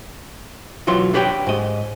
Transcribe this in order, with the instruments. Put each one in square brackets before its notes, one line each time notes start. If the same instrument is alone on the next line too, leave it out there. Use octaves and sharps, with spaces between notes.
[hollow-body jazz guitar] B1 E3 F#3 F4 C6
D4 G4 B4 C#5 G5
G#2 D#5